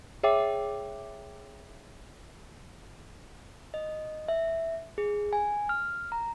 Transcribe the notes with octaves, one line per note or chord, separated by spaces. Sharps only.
G#4 C#5 E5 G5 D6
D#5
E5
G#4
G#5
F6
A#5